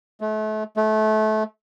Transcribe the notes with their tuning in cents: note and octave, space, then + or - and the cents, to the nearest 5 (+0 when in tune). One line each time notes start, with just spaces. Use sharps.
A3 -35
A3 -25